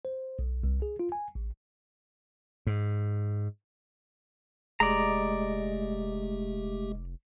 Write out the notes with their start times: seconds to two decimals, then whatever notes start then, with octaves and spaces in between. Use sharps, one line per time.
0.05 C5
0.39 B1
0.64 C2
0.82 G#4
0.99 F4
1.12 G#5
1.35 A1
2.67 G#2
4.80 F1 G#3 A3 G4 D5 D#5 A#5